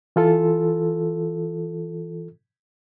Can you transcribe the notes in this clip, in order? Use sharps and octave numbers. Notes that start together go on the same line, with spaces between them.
E3 F4 A4